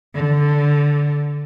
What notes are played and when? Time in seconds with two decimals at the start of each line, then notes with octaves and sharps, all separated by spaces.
0.15 D3